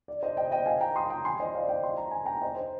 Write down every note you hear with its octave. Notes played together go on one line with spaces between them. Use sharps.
D5
C5 D#5
D#5 G5
D#5 G5
F5 G#5
G5 A#5
C6 D#6
G5 A#5
G#5 C6
C5 D#5
D5 F5
D#5 G5
C6
A#5
G#5
G5 A#5
C5 D#5
C5